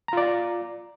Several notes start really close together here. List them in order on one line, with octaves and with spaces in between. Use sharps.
A#5 F4 D5